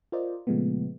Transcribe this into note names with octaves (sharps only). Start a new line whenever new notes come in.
F4 A#4 C5 D5 D#5
A#2 C#3 F3 G#3 A3 B3